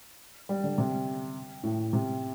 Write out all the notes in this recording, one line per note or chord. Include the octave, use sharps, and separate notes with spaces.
G3
D3
C3
A2
C3